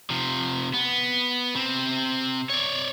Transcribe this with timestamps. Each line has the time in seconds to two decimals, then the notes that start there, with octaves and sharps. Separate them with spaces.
0.10 C3 F3
0.74 B3
1.55 C3 C4
2.50 C#5 D5